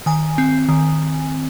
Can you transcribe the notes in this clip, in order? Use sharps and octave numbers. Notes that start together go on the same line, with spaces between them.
D#3 G#5
C4
D#3